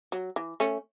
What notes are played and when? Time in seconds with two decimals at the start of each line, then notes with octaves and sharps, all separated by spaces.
0.12 F#3
0.36 E3
0.60 A3 C#4